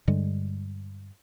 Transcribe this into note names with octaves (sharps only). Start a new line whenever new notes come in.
G2 D3 G3 G#3